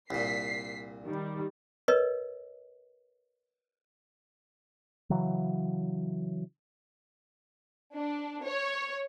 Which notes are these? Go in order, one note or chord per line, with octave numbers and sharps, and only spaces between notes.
C2 A#2 B6 C7
D#3 G3
A#4 B4 C#5 D#5
C#3 E3 F#3
D4
C#5